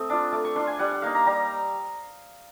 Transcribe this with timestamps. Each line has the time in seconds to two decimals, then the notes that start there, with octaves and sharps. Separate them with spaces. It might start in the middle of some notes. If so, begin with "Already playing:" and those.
Already playing: A3 C4 D#6
0.10 D4 F4
0.32 A3 D6
0.44 C#6
0.56 D4 F4 C6
0.67 G#5
0.79 G3 F#5
0.91 F#5
1.02 A#3 D#4 F5
1.15 A#5
1.26 G3 A#5